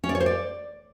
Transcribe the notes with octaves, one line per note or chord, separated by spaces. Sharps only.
C#4
D5
C#5
C5
D5